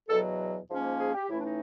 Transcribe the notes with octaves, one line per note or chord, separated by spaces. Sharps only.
E2 B2 F#3 A4
G#2 F3 A#3 C#4
G#4
G4
A2 E3 A3 C#4 E4
D4
D#4